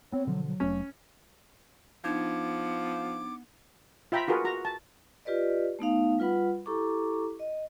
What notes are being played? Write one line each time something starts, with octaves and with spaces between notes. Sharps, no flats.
B3 C4 C#5
B2 D3 F3 F#3
F#3
F1 A3 C#4
F3 B3 D4 D#4 D6 G#6
F4 E5 G5 A#5 B5
F4 F#4 G#4 A#4 B4
F#4 A#5
A5
F4 G4 B4 D5 D#5
A3 B3 D#4 F5
G3 F4 B4 F#5 B5
E4 G4 A4 A#5 C#6 D6
D#5